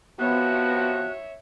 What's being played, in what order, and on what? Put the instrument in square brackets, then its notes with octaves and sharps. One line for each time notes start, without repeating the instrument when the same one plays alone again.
[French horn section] C3 F3 F#4 [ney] B3 [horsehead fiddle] C#5 E5 [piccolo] F#6